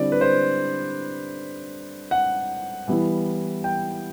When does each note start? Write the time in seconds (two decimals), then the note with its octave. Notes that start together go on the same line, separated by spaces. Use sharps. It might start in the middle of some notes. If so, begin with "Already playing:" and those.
Already playing: D3 G3 C4 E4 D5
0.12 B4
0.21 C5
2.11 F#5
2.88 E3 G3 B3 E4
3.64 G5